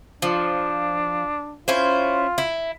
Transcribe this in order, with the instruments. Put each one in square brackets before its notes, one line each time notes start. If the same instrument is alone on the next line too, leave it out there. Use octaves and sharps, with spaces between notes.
[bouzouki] F3 [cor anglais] D4
[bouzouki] C#4 E4 C5 [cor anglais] F4
[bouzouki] E4